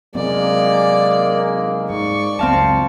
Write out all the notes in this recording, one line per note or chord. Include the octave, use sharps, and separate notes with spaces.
C3 F#3 G#3 A#3 C4 D5
G#2 D5 C#6
C#2 F#2 C4 F5 A5